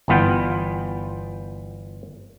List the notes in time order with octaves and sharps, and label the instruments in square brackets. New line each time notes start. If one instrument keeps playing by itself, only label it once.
[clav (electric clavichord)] G1 E3 B3 F4 G5